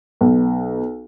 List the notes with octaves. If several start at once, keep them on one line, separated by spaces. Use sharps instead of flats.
B1